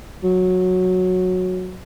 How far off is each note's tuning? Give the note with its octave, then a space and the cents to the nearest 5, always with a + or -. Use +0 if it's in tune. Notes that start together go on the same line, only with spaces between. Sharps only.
F#3 -10